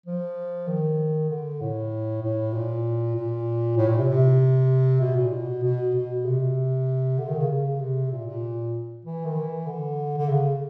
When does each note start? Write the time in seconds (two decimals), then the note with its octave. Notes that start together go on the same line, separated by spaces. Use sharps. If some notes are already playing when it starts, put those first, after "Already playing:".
0.06 F3
0.67 D#3
1.30 D3
1.61 A2
2.22 A2
2.53 A#2
3.15 A#2
3.77 A2
3.88 A#2
3.98 C3
4.08 C3
5.01 B2
5.17 A#2
5.32 B2
5.63 B2
5.95 B2
6.25 C3
7.18 D3
7.28 D#3
7.38 C#3
7.49 C#3
7.80 C3
8.11 A#2
8.26 A#2
9.05 E3
9.25 D#3
9.35 E3
9.66 D3
10.17 D3
10.29 C#3